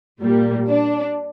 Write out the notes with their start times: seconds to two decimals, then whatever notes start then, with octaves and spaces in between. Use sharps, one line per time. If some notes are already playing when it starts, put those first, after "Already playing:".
0.20 A#2 G3 A#3
0.69 D4